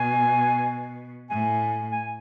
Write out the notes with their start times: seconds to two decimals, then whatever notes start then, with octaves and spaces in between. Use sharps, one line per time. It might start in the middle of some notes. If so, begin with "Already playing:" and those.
Already playing: B2 G#5
1.30 A2 G#5
1.92 G#5